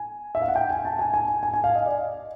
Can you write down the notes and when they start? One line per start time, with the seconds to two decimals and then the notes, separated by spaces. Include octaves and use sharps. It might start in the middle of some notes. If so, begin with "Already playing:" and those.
Already playing: G#5
0.35 E5
0.42 F5
0.48 F#5
0.56 G5
0.70 G#5
0.85 A5
0.99 G#5
1.14 G#5
1.28 G#5
1.43 G#5
1.54 G#5
1.64 F5
1.75 D#5
1.86 D5